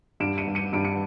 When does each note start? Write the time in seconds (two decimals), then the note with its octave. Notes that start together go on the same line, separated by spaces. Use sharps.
0.20 G2 D7 E7
0.38 C#7 D#7
0.47 G2
0.55 C#7 D#7
0.73 G2 D7
0.85 C#7